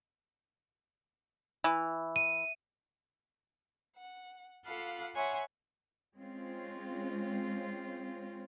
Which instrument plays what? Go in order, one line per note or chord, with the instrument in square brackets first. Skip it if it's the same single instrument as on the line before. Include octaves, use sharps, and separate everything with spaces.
[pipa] E3
[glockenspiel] D#7
[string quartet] F#5
F4 A4 F5 F#5 B5 D6
C#5 E5 F#5 G#5 B5 C6
[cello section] G#3 C4 C#4 F4